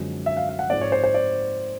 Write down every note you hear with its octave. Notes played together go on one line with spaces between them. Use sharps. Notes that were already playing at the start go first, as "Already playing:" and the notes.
Already playing: F#2 D3 F3 G#3 C4
E5
F5
F5
F#5
G#2 F3 G#3 C4 D5
C#5
C5
C5
D5